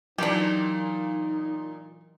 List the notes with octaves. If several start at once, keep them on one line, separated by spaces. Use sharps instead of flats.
A#2 D#3 E3 F#3 A#3 D4 D#4 G4